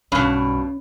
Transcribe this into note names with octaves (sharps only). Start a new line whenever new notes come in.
B1 G2 B2 C#4